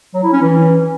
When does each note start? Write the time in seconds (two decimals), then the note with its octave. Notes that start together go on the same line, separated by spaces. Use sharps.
0.14 F#3
0.23 E4
0.33 C#4
0.42 E3